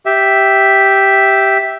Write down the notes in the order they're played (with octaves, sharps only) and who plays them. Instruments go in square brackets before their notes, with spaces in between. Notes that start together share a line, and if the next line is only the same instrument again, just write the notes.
[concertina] G4 E5